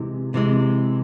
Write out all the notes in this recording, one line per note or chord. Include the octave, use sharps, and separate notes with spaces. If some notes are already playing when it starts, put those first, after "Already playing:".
Already playing: C3 E3 G#3
C3 E3 G#3